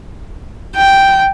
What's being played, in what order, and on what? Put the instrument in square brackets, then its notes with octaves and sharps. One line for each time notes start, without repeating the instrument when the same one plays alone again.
[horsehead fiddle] G5